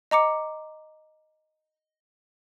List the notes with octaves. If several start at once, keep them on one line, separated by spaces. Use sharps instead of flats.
D#5 A#5 D6 C#7